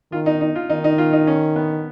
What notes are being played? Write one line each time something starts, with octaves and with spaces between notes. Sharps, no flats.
D#3 F4
D#4
D#4
F4
D#3 D#4
D#4
F4
D#4
C#4
B3